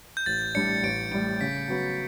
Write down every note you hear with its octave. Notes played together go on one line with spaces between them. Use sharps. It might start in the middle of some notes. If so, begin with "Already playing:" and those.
G6
A1 A6
A2 G3 D4 C#7
A1 D7
A2 G3 D7
C#3 B6
F#3 B3 F#4